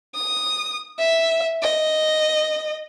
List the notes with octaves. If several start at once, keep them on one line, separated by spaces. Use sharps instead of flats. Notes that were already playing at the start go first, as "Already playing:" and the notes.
D#6
E5
D#5